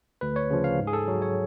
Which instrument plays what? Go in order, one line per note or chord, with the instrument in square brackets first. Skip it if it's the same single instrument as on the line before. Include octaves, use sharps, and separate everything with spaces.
[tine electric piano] D2 B4
C#5
C#3 F3
F5
G#2
G#4
A4
F#3
C#5